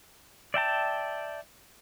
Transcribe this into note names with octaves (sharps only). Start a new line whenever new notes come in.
D5 E5 G5 A5